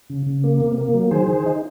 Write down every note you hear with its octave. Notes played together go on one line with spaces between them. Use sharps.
C#3
C#3
A#3
C3
A#3
F#3
D#3 G#4 C5
D#3
D#4